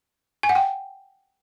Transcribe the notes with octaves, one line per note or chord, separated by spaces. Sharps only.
G#5
F#5
G5